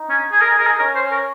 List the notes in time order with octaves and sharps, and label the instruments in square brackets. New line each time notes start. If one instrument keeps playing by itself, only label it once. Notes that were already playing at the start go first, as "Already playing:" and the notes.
Already playing: [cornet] D#4
[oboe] C#4
G#4
A#4
G#4
A#4
G#4
[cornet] C#4 [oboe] A#4
[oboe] C5
A#4